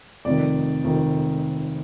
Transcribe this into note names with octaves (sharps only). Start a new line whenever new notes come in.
F1 F2 D#3 D5
F1 F2 D#3